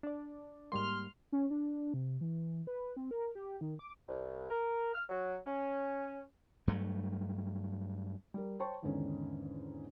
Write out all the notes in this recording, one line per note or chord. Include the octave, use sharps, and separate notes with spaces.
D4 D5
G#2 G3 A#3 C6 F6
C#4
D4
C3
E3
B4
C4
A#4
G4
D#3
D6
C2
A#4
F6
F#3
C#4
G2 F#3 A3
G3 A#4
C5 C#5 G5 A5 C6 C#6
E2 G#2 D3 D#3 C#4